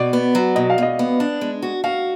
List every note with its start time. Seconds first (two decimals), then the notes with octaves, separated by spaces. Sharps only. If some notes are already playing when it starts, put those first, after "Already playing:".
Already playing: B2 D5
0.13 B3
0.35 F#3
0.56 B2 D#5
0.70 F5
0.78 B2 D#5
0.99 B3
1.20 D4
1.41 G#3
1.62 F#4
1.84 F#4 F5